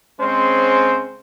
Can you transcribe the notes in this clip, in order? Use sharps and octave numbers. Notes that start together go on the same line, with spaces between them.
C#3 G#3 C4 C#4 C5